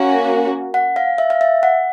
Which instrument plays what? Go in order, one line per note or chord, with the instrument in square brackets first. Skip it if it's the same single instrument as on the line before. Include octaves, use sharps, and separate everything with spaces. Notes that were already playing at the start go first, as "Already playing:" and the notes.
Already playing: [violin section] A#3 C#4 F#4 [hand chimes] F5
[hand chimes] F#5
F5
E5
F5
E5
F#5